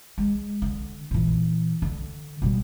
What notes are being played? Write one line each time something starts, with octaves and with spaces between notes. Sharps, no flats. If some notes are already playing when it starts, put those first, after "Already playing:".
G#3
D3
A#2 E3
D3
B2 G3